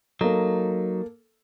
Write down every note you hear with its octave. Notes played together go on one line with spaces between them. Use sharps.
F#3 A#3 D#4 A4